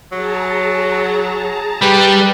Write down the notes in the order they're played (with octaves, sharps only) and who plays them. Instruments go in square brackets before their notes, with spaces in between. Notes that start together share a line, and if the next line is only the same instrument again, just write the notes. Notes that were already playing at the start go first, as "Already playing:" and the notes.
[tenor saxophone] F#3 [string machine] G#4 A5 A#5
[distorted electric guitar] G3 [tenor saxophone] G4 [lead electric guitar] B4 B5